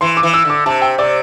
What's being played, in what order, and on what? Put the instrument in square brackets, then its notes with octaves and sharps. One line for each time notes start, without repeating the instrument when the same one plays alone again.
[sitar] E3 [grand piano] C6
[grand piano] D6
[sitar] E3
[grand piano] E6
[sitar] D3 [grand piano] D6
[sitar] C3 [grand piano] A5
[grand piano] G5
[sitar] C3 [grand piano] D5